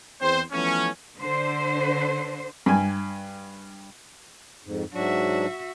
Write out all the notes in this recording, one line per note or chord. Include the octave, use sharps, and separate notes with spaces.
E2 C4 C5
E3 F3 A3 B3 C#4
D3 C5
G2 G#5
F2 G#2
G#2 F#3 D4 F#4 E5